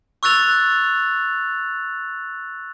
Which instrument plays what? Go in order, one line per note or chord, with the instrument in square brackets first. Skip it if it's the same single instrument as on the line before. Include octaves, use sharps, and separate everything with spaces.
[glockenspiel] C#6 E6 F#6 A6 F7